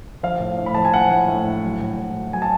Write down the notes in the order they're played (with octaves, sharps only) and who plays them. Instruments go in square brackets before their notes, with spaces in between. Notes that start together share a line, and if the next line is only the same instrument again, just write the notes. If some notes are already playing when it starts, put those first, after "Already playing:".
[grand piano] F3 F5
A2
A2
B5
F3 A5
G#5
F3 F#5
A2
A2
F3
F#3
A2
A2
F#3
F#3 G#5
A5